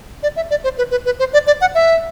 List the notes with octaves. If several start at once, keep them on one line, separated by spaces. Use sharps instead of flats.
D5
E5
D5
C5
B4
B4
B4
C5
D5
D5
F#5
E5